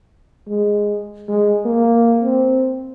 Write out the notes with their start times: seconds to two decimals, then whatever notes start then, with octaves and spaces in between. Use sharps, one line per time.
0.48 G#3
1.28 G#3
1.65 A#3
2.23 C4